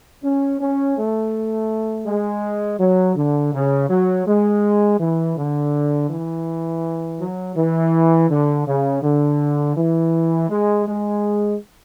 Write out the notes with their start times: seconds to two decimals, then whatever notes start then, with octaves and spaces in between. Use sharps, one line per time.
0.23 C#4
0.60 C#4
0.96 A3
2.06 G#3
2.80 F#3
3.16 D3
3.54 C#3
3.90 F#3
4.27 G#3
5.00 E3
5.37 D3
6.10 E3
7.20 F#3
7.56 E3
8.30 D3
8.67 C#3
9.03 D3
9.77 E3
10.49 G#3
10.86 G#3